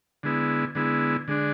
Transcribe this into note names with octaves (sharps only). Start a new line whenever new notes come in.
D3 G#3 B3 E4
D3 G#3 B3 E4
D3 G#3 D4